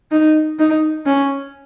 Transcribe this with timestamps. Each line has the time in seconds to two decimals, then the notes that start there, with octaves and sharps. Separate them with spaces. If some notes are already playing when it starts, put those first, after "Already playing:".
0.11 D#4
0.59 D#4
1.06 C#4